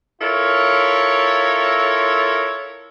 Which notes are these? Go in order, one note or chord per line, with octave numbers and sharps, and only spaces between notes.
E4 F4 A4 A#4 C#5